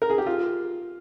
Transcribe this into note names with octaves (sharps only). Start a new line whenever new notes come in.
A#4
G#4
G4
F4